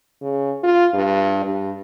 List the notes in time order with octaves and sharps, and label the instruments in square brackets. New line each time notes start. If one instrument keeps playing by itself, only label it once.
[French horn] C#3
F4
G2
G2